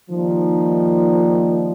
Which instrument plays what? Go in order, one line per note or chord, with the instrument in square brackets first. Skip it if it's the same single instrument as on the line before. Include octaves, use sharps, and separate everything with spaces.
[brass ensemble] D#3 G3 A#3 D#4 [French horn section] F3